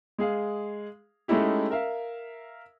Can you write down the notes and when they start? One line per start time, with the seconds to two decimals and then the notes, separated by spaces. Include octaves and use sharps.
0.18 G#3 G#4 F5
1.28 G#3 A3 C#4 D#4 E4 G4
1.70 A#4 E5 F5